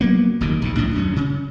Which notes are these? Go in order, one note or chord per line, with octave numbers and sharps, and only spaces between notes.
F#3 A#3 B3
F#1 D#2 A#2 D#3
A#1 D#2 C3
C#2 A2 D4
D#1 F#2 C#4
C#3